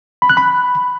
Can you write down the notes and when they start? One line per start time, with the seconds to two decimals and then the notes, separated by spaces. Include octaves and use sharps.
0.22 B5
0.30 F#6
0.37 B5